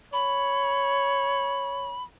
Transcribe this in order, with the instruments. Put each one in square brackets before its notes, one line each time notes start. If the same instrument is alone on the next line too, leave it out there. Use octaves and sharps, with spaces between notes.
[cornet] C#5 [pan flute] B5